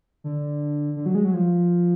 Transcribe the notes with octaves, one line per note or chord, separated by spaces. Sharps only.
D3
D3
F#3
G#3
F#3
F3